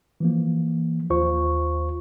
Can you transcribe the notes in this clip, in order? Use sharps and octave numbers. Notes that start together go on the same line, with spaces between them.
E3 F3 A#3
D#2 F4 C5 C#6